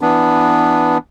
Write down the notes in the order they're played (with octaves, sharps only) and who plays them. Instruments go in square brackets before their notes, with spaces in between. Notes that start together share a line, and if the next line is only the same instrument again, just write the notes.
[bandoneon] E3 B3 D4